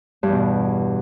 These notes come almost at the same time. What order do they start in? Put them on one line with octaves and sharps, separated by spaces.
G2 E2 B2